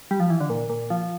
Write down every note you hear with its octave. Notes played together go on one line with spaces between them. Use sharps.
G3
F3
E3
D3
A#2
A#2
F3